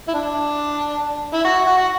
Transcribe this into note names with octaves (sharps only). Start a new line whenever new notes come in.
E4
D4
E4
F#4
F#4
F#4